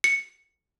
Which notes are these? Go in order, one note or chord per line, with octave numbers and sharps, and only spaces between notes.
C#7